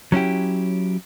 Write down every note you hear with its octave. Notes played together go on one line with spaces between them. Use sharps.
F#3 C#4 E4 G4